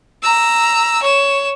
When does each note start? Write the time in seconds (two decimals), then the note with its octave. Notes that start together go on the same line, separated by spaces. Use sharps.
0.23 A#5 E6
1.02 C#5 E7